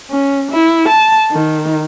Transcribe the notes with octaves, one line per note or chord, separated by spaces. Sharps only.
C#4
E4
A5
D#3